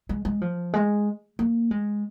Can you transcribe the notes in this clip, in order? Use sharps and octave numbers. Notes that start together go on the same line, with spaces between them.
G#3
G#3
F3
G#3
A#3
G#3